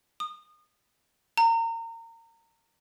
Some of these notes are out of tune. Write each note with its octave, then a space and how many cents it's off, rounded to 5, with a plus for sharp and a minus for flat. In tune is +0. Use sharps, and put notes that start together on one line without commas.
D#6 -25
A#5 -30